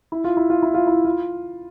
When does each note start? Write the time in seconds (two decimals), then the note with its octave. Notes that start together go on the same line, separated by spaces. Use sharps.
0.12 E4
0.24 F4
0.37 E4
0.50 F4
0.63 E4
0.74 F4
0.87 E4
1.05 F4